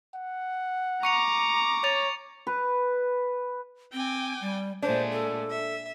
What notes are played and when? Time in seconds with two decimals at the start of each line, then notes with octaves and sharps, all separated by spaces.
0.15 F#5
1.03 A#5 C#6 D6 C#7 F7
1.84 C#5 C#6 A6 F7
2.47 B4
3.93 C4 G5 G#5 D6
4.41 G3
4.82 A#2 G#3 A3 D4 C5
5.12 A4
5.51 E5